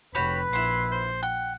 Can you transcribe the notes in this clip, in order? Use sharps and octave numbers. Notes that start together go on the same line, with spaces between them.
F1 F#4 G4 B4 C#5 B5
A#1 E4 F#5 C6
C5
F#5 G5